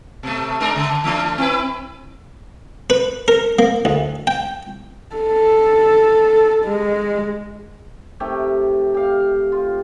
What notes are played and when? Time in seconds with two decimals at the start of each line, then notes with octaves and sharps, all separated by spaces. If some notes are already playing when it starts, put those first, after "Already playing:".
0.23 B2 A3
0.60 G#3 D4 A#4
0.76 C#3
1.04 E3 A3 D4
1.38 C4 E4 B4
2.90 B4
3.28 A#4
3.59 A#3
3.85 D2
4.27 G5
5.15 A4
6.65 G#3
8.20 C3 D#3 A3 G4
8.94 G4 F5
9.52 F4